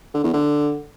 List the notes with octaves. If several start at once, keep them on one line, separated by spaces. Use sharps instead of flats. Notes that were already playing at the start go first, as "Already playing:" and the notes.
D3
E2
D3